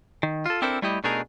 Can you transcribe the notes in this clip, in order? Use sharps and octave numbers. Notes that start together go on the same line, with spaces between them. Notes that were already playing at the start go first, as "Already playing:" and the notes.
D#3
F4 A4
C4 D4 E4 A4 A#4 C5
G3 A3 E4 G4 D#5
B2 A3 D4 D#4 G#4 A#4